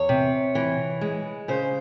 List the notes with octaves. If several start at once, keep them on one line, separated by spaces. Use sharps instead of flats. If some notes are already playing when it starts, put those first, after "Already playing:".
Already playing: E2 C#5
C3
E3
G#3
C#3 C5